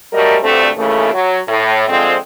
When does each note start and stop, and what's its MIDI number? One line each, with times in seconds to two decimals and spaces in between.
0.12 0.35 54
0.12 0.35 55
0.12 0.35 57
0.12 0.35 70
0.12 0.35 75
0.42 0.68 38
0.42 0.68 43
0.42 0.68 50
0.42 0.68 57
0.42 0.68 60
0.76 1.10 39
0.76 1.10 49
0.76 1.10 52
0.76 1.10 57
1.13 1.38 54
1.47 1.83 45
1.88 2.15 50
1.88 2.15 53
1.88 2.15 56
1.88 2.15 60